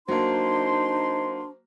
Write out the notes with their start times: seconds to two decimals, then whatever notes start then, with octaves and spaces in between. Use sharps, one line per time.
0.08 F#3 A#3 D4 D#4 C5 C6